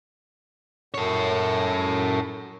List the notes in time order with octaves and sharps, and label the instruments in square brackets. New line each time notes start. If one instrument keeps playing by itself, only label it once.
[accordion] F#2 [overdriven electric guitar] A4 C#5